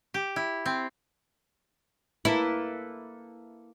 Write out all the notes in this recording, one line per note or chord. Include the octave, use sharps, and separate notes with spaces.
G4
E4
C4
A#3 E4 A4 B4